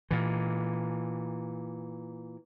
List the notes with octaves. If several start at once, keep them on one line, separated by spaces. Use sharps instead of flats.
A#2 E3